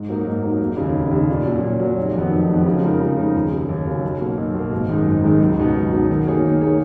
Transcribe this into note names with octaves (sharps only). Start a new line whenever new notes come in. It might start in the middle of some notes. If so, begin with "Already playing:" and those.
Already playing: G#2
F#3 A#3 D#4 A#4
G#2
F#3 A#3 D#4 A#4
F1
D#2 C#3
F1
D#2 C#3
A#2
F#3 C#4
A#2
F#3 C#4
F1
F2 D#3 F#3 B3
F1
F2 D#3 F#3 B3
C#3
F3 G#3 D#4 A#4
C#3
F3 G#3 D#4 A#4
D#2
C#3 F#3 C#4
D#2
C#3 F#3 C#4
B1
B2 A#3
B1
B2 A#3
G#1
F#2 D#3 G#3 D#4
G#1
F#2 D#3 G#3 D#4
C#2
B2 F#3 B3 D#4
C#2
B2 F#3 B3 D#4
D#3
A#3 D#4 G#4 C#5
D#3
A#3 D#4 G#4 C#5